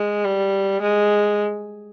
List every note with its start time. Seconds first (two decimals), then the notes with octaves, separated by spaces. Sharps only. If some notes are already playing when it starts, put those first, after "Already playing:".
Already playing: G#3
0.24 G3
0.81 G#3